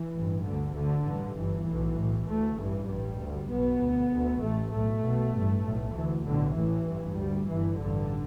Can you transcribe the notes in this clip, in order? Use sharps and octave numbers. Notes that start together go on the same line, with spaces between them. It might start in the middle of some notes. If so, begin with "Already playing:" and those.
Already playing: E3
A1 G2
D2 D3
D2 D3
A1 G2
G1 G2 E3
B1 A2
B1 A2
D2 A3
A1 G2 E3
A1 G2 G3
D2
B1 B2 B3
D2
D2
A1 A2 A3
B1 A2 A3
B1 B2
A1 G2
B1 A2
D2 E3
B1 A2 D3
A1 A2 E3
A1 G2
D2 G3
G1 G2 E3
A1 G2 D3